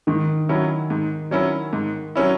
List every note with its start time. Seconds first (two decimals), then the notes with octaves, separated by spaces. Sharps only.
0.07 G#2 D#3
0.49 F#3 C#4 E4
0.90 G#2
1.31 F#3 C#4 E4
1.73 G#2
2.15 F#3 C#4 E4